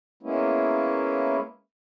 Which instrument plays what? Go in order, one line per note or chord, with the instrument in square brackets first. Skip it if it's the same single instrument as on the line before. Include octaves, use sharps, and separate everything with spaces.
[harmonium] G#3 A#3 B3 C#4 E4